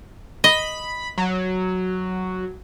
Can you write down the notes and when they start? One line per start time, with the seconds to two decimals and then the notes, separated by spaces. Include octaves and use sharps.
0.44 D#5 B5
1.18 F#3